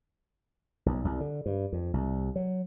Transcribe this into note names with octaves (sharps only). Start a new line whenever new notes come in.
B1
C2
D3
G2
F2
C2
F#3